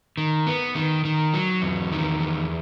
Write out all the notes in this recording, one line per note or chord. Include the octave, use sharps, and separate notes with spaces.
D#3
B3
D#3
D#3
F#3
E2
D#3
E2